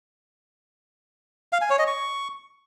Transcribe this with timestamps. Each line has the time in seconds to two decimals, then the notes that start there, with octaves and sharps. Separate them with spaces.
1.53 F5
1.61 G#5
1.70 C#5
1.79 D#5
1.87 C#6